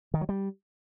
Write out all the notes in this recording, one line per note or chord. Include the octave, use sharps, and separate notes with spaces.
D#3
F#3
G3